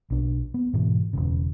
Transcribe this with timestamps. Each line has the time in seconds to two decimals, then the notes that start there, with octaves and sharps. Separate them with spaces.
0.10 B1 D4
0.54 B3
0.73 G#2 B2 E3
1.13 E1 A#1 C#3